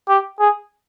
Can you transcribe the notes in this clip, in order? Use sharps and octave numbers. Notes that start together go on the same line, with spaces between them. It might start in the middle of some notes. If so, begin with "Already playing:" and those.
G4
G#4